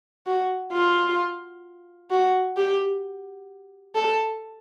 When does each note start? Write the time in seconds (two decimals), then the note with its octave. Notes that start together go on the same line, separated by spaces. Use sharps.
0.26 F#4
0.73 F4
2.11 F#4
2.57 G4
3.96 A4